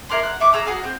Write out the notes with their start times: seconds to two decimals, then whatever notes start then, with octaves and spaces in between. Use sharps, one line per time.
0.09 E4 A#4 D5 C6
0.23 F#5
0.40 E5 C#6 D6
0.53 G#4 A#5 E6
0.66 F#4 G#4 F5
0.84 C4